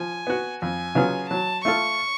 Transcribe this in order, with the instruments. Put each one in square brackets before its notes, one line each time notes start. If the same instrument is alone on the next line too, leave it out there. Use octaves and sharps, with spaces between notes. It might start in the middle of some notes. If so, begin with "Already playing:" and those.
Already playing: [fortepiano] F3 [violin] G#5
[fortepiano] B3 F#4
[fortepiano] F2 [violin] G#5
[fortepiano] C#3 F#3 B3 F4
[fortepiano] F#3 [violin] A5
[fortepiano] A3 F4 A4 [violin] C#6